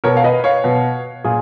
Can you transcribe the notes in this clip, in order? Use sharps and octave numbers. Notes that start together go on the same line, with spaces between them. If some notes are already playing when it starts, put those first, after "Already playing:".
B2 A#4 C#5
F5
B4 D#5
C#5 F5
B2
A#2 F4 G#4